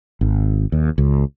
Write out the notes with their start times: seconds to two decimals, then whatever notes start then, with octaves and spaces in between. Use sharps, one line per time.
0.21 G#1
0.72 D#2
0.98 C#2